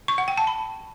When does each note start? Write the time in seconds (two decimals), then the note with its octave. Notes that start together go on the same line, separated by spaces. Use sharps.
0.08 C#6
0.18 F#5
0.28 G5
0.38 A5
0.47 B5